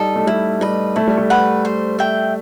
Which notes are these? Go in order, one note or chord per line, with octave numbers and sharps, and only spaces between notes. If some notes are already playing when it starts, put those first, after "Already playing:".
Already playing: G3 D#4 A4 D#5
A3
G3 E4
G3 B4 D#5
A3 E4
G3
A3
B4 F#5
C5
E5 G5